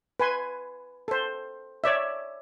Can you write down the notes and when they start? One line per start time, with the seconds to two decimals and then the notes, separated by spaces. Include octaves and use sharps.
0.20 B4 G#5 C6
1.08 A4 C5
1.84 C#5 D5 E5